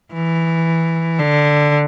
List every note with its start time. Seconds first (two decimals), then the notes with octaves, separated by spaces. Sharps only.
0.13 E3
1.19 D3